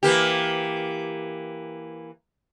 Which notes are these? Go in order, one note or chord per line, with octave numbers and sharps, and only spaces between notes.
E3 A#3 G4